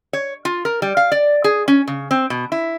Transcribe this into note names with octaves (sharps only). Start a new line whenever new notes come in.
C#5
F4
A#4
G3
F5
D5
G#4
C#4
C#3
C4
B2
E4